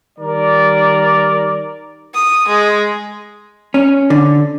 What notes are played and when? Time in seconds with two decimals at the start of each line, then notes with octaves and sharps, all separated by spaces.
0.19 D#3 G3 A#4 D5
2.14 D#6
2.48 G#3
3.74 C#4
4.10 D3